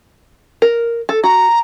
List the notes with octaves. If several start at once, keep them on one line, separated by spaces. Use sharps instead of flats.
A#4
A4
F#4 A#5